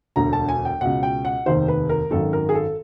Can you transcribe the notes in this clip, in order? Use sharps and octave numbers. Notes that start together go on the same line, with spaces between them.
E1 D2 D3 A#5
A5
G#5
G5
C#2 B2 F#5
G5
F#5
F1 D#2 D#3 C5
B4
A#4
G#1 F#2 D#3 A4
A#4
G#4
A4